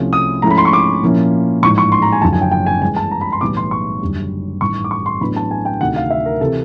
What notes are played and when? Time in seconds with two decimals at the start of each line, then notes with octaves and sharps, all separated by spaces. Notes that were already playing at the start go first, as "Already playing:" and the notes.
Already playing: C2 C3 F3 A3 C#4
0.13 D#6
0.42 G#2 F3 A3 C#4 E4 A#5
0.50 B5
0.58 C6
0.65 C#6
0.73 D6
1.02 A#2 F3 A#3 C#4 E4
1.62 A1 G#2 F3 C#6
1.78 C#6
1.92 C6
2.02 A#5
2.12 G#5
2.22 F#1 F#2 D3 F3 A5
2.33 G#5
2.41 G5
2.51 G5
2.66 G#5
2.81 G2 E3 G#3 G#5
2.96 A5
3.11 A#5
3.21 B5
3.32 C6
3.41 B1 A2 E3 G3 B3 D6
3.57 C6
3.71 C#6
4.01 F#1 F#2 D3 G3
4.61 A1 G2 D#3 C#6
4.84 D6
4.91 C#6
5.06 C6
5.21 A1 A2 F#3 B3 D4 B5
5.36 A5
5.51 G#5
5.65 G5
5.80 D2 C3 D#3 F#5
5.96 F5
6.10 E5
6.26 A#4
6.41 C3 E3 A4